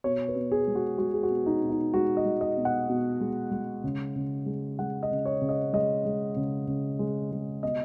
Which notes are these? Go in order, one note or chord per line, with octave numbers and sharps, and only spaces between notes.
B2 C#5
B4
B2
G#4
G#3
F#4
G#3 F#4
G#4
F#4
B2
D#4
B2
D#4
G#3 F#4
D#5
G#3
D#5
B2
F#5
B2
G#3
G#3
C#3
C#3
G#3
G#3 F#5
D#5
C#3
C#5
C#3
D#5
G#3 D#5
G#3
C#3
C#3
G#3
G#3
B2 D#5